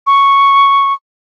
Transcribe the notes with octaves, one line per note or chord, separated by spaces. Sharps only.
C#6